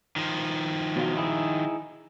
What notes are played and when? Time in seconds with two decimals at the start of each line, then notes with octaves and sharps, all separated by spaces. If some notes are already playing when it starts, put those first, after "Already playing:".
0.16 D#3 F3
0.96 B2 F#3 F4
1.16 D#4 E4 G#4